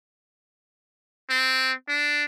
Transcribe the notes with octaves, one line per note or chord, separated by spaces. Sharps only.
C4
D4